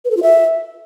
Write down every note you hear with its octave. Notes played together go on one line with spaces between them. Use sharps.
B4
A4
F4
E5